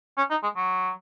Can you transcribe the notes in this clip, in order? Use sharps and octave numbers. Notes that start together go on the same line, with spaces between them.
C#4
D#4
G#3
F#3